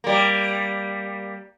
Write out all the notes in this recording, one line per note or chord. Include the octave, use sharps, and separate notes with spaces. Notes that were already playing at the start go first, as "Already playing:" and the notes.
G3 A#3